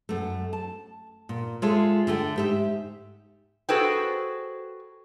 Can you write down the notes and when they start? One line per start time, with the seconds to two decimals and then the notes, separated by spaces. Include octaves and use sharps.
0.09 F#2 A3
0.53 A5
1.29 A#2
1.62 G#3 F4 G#4 A4 C#5 E5
2.07 D3 A3 F#5 G5
2.36 G#2 G4 E5
3.69 F#4 G#4 A4 B4 C5 G5